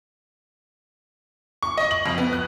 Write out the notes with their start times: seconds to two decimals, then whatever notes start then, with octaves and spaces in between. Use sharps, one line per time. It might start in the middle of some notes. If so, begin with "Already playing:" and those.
1.63 C#6
1.78 D#5
1.91 F#7
2.06 F2
2.18 B3
2.33 F#6